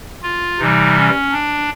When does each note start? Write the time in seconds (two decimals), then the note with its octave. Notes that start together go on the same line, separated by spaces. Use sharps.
0.23 F4
0.59 C3 E3 G3 D#4
0.96 C#4
1.32 D4